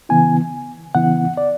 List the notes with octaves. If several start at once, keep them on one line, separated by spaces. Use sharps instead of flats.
C#3 E3 B3 E4 G#5
C#3 E3 B3 E4 F#5
D5